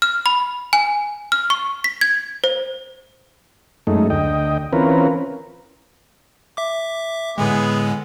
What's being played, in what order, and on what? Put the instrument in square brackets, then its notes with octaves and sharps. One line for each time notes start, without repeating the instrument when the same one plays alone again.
[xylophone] F6
B5
G#5
F6
C#6
B6
G#6
C5
[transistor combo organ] F#2 G#3 A3 D#4
D2 D#5 G5
E3 C4 C#4 F4 A#4 B4
[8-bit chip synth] E5 D6
[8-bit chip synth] A2 D3 G#3 [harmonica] B3 G#4